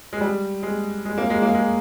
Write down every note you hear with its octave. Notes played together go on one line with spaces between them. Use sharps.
G#3
G3
G#3
G#3
A#3
G#3
A#3
G#3